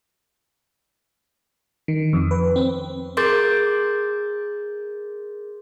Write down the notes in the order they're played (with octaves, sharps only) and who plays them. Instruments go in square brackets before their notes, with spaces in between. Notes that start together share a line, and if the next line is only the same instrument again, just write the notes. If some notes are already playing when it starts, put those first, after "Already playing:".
[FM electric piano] D#3
F2
B4
C4
[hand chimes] G#4 A#4 C6 D6 G6 A6